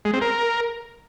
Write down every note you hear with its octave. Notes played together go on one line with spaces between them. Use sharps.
G#3
C4
A#4